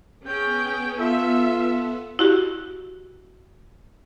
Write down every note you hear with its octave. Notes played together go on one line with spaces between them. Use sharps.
B3 C#4 G#4 G5
F4 A4 E5
E4 F#4 G4